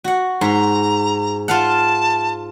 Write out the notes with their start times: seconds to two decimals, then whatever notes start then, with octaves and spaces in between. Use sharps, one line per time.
0.04 F#4 F#5
0.41 G#2 A#5 C6
1.48 F4 F5 F#5 A5